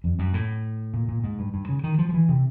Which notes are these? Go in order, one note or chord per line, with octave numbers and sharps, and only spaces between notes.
F2
F#2
A2
A#2
A#2
G#2
G2
G2
C#3
D#3
F3
F3
E3
C3